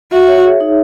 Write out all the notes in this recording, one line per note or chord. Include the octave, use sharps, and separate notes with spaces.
F#4 E5
C#5
G#4
D#4